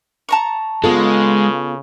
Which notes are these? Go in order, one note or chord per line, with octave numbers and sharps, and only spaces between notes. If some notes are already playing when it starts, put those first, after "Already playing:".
A5 A#5 C#6
C#3 G#3 B3 F4 A4